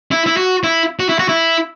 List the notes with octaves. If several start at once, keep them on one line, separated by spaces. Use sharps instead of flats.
E4
E4
F#4
E4
F#4
E4
F#4
E4